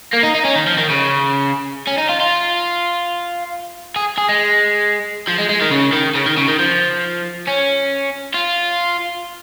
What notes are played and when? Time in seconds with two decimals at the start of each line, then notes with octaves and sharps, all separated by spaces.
0.13 A#3
0.23 D#4
0.35 D#4
0.45 C#4
0.56 D#3
0.67 F3
0.78 D#3
0.90 C#3
1.87 C#4
1.98 D#4
2.09 F4
2.20 F4
3.96 G#4
4.18 G#4
4.29 G#3
5.27 F3
5.38 G#3
5.49 G#3
5.61 D#3
5.71 C#3
5.93 D#3
6.15 C#3
6.26 D#3
6.38 C#3
6.48 D#3
6.59 F3
7.47 C#4
8.34 F4